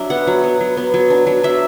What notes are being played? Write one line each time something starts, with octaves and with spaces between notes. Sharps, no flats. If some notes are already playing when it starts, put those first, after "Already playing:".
Already playing: F#3 D4 E5
B3 F#5
F#3
B3
F#3
B3
F#3
D4
F#3
D4 E5